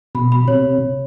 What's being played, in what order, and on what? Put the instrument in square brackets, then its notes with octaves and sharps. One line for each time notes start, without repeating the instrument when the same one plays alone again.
[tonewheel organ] B2 [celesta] B5
[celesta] B5
[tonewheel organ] C3 [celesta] C#5